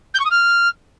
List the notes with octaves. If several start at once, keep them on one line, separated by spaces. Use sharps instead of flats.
G6
C#6
D#6
F6